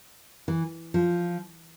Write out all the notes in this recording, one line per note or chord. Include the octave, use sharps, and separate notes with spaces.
E3
F3